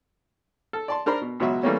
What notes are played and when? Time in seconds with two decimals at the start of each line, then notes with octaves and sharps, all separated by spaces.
0.73 A4
0.88 D5 A5 C6
1.06 D4 A#4 C5 A#5 B5
1.22 B2
1.40 C#2 B2 F#3 F#4 E5
1.63 E3 G3 A3 A#3 C4 C#4